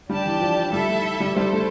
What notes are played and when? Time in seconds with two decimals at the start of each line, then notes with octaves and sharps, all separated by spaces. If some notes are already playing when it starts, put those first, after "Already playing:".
0.10 G3 D4 G4 D5 A5
0.25 E3
0.41 F3
0.73 G3 E4 A4 E5
0.89 A3
1.20 G3
1.36 G3 E4 A4 C5
1.53 A3